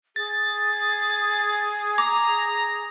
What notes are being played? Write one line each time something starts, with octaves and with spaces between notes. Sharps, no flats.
G#4 A6
A#5 D6